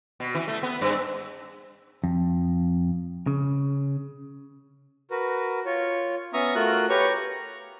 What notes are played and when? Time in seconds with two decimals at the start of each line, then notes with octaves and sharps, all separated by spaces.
0.20 B2
0.35 E3
0.48 A3
0.63 B3
0.81 G2
2.04 F2
3.27 C#3
5.11 F#4 A#4 B4
5.66 F4 C#5
6.33 B3 C#4 E5 A#5 C#6 D#6
6.55 A3 F4 F#4 A#4 F#6
6.90 G4 B4 C#5 A#5 C#6
7.14 A#5